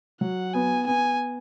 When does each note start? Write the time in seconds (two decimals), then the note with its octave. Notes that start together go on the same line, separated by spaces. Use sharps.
0.21 F#3 F#5
0.53 B3 G#5
0.87 B3 G#5